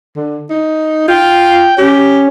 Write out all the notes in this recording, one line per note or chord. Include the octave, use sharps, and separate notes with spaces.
D3
D#4
F4 G5
C#4 G4